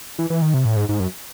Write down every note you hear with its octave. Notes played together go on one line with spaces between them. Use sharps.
E3
E3
D#3
C3
A2
G#2
G#2
F#2